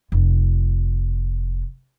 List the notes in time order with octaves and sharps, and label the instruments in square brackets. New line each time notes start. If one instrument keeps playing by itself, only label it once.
[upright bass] F1 F4